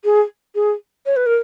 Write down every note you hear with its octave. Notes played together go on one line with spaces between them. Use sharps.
G#4
G#4
C#5
B4
A#4